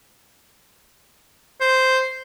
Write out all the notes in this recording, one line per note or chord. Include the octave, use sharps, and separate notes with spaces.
C5